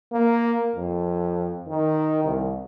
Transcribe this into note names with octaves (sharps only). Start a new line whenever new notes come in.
A#3
F2
D#3
C2